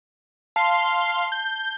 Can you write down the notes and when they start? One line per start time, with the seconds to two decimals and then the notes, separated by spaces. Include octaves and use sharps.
0.56 F5 A5 C6 C7
1.32 G6